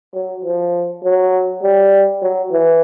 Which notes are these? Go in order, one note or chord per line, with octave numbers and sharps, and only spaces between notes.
F#3
F3
F#3
G3
F#3
E3